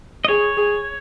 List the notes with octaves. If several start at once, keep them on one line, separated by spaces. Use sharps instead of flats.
D#5
G#4 C#5
G#4